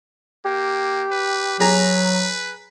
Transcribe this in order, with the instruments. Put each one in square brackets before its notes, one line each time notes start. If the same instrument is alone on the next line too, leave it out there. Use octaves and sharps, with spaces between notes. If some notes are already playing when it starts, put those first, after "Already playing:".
[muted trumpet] A#3 [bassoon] G4
[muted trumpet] B4
[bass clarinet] F#3 [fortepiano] G#4 A#5 [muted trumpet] B4